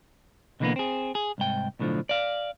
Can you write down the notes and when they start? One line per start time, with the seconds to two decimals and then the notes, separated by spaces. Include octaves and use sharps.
0.60 B2 D3 E3 G3 A#3 B3
0.76 C4 G#4
1.15 G#4
1.38 C2 G#2 G5
1.80 B1 A2 D3 D#3 F3
2.09 D5 F5